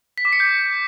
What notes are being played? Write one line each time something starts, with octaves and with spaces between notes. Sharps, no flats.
B6
D6
C#7
G6